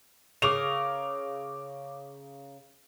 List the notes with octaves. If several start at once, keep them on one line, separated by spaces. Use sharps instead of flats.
C#3 A#4 D6 F7